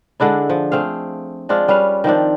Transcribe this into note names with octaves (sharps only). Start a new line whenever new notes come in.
D3 G#3 D4 E4
F3
A3 C4 G#4 F5
G#3 C4 D4 F4
G3 C#4 B4 F5
D#3 F3 C4 D4